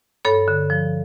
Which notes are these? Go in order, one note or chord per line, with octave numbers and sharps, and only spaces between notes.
G2 A4 C#5
D3
F3